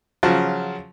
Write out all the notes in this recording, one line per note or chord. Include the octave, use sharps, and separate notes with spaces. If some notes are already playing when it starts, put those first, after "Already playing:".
C#3 F3 F#3